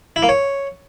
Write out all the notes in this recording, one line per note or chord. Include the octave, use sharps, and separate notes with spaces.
E4
A#3
C#5